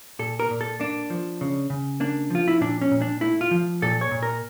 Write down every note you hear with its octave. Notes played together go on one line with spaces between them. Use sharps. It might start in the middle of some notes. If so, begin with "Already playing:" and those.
A#2 A4
A#4
A#2
A4
A#3 D4
F3
C#3
C#3
A#3 D4
F3 F4
E4
A#2 D4
C#4
A#2
D4
A3 E4
F4
F3
A#2 A4
C#5
A#2
A#4